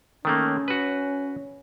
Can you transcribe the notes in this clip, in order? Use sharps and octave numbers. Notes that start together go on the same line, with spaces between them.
D#3 A3 A#3 C#4
F#4 B4